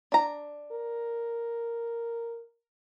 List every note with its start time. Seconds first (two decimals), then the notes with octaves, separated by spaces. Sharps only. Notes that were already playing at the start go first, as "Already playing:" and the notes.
0.12 D4 A#5
0.72 A#4